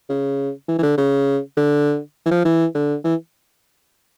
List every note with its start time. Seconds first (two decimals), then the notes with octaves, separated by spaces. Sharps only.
0.09 C#3
0.68 E3
0.79 E3
0.83 D3
0.97 C#3
1.57 D3
2.26 E3
2.31 F3
2.45 E3
2.75 D3
3.04 E3